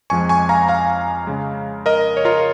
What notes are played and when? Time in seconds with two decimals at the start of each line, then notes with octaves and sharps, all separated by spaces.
0.10 F2 F3 G#3 G#5 C#6
0.29 G#5 C#6
0.49 F5 A#5
0.68 F5 A#5
1.27 C#3 G#3
1.86 A#4 D#5
2.17 C#5
2.25 F4 A#4